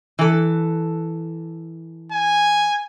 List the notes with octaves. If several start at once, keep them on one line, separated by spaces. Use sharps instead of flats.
E3 A4
G#5